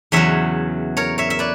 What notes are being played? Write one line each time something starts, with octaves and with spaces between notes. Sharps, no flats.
E2 C#3 F#3 C#5 E5
A#4 C#5
C#5 E5
E5
B4 D5